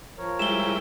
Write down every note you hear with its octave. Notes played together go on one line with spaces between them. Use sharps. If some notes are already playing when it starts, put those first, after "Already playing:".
F3 A#4 C#5
G3 G#3 E4 E7 G7